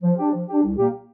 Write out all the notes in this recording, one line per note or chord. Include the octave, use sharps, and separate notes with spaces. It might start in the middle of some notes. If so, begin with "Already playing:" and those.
F3
D4 G4
F3
D4 G4
C2
A#2 A#3 G4